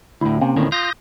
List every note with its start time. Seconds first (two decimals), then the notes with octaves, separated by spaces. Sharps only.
0.21 D2 A2 E4
0.42 C3 A#3 C4 C#4
0.56 D2 A2 D#3
0.72 F4 D#6 G6 A#6